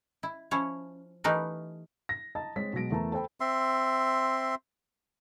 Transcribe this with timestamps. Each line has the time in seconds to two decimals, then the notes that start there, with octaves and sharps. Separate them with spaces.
0.23 E4
0.51 F3 C#4 E4 C#5
1.24 E3 A3 D#4 G4 A#4 B4
2.09 A#6
2.35 D#5 A5 A#5 A6
2.56 G#3 C4 C#5 B6
2.73 B2 F#3 G#3 A#6 D7
2.90 E2 E3 A3 A#4 A5 A#5
3.12 A4 C5 G5 B5
3.40 C4 E5 C6